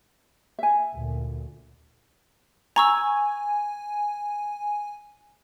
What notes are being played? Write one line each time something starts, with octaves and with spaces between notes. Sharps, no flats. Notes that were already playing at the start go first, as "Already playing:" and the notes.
E5 G#5
D2 A#2
G#5 A#5 C#6 E6